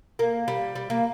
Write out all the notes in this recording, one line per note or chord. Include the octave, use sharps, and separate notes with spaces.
A#3
G3
G3
A#3